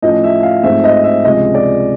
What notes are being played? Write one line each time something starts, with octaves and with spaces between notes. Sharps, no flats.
A2 F3 A3 C#4 D#5
E5
F5
G#2 F3 A3 C4 E5
D#5
E5
C#2 C3 F3 G#3 D#5
D5